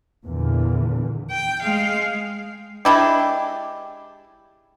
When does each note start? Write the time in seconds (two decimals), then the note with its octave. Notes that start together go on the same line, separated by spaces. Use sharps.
0.25 E2 A#2 D3
1.31 G5
1.63 G#3 F5
2.85 G#3 D4 E4 G4